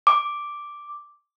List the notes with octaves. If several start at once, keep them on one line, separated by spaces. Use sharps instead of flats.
D6